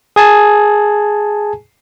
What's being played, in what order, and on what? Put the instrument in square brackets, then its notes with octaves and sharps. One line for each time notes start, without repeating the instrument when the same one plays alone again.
[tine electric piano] G#4 G#5 A5